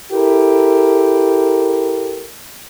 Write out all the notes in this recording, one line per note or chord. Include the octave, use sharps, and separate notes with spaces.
E4 G4 A4 A#4